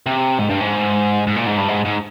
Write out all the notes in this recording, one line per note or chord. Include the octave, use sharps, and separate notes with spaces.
C3
G#2
G2
G#2
G#2
A#2
G#2
G2
G#2
G#2